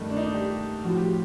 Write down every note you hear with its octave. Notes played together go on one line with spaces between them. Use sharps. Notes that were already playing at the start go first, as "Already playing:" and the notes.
Already playing: G2 D#3 A3
D4
D#4
D4
G4
A2 F3 F#4
G4